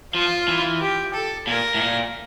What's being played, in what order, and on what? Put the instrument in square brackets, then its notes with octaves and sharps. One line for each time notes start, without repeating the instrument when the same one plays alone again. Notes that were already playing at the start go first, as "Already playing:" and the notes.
[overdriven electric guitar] F3 [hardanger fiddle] F4
[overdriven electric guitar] E3
[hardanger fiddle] G4
A4
[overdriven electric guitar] A#2 [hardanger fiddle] A#4
[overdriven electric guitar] A2
A#2